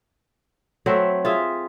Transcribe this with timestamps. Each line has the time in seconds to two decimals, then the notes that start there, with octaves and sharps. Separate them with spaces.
0.86 F#3 A3 C4 E5
1.25 F4 G#4 E5